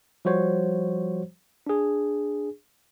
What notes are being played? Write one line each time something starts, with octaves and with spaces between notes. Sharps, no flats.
F3 G3 F#4 C5 C#5
D4 G#4